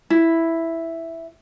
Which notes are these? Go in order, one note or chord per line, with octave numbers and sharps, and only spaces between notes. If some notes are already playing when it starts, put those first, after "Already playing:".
E4